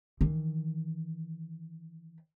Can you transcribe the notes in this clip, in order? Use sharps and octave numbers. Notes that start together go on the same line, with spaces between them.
D#3 E3